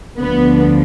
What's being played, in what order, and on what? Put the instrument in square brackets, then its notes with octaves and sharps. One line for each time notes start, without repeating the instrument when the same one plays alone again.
[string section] D2 D3 F3 B3